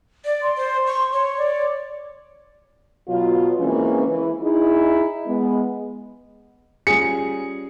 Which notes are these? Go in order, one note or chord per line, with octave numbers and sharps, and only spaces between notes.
D5
C6
C5
C#6
C#5
D5
B2 F#3 F4
C#3 E3 G#3 A#3 C4 C#4
E3
D#4 E4 G#4
G#3 B3
G3 C#4 F4 G#4 C#7